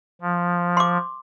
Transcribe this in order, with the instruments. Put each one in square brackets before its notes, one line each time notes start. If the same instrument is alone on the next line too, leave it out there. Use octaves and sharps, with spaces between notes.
[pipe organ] F3
[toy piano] C6 D6